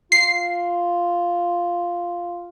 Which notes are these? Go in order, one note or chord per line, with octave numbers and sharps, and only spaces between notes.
F4 C7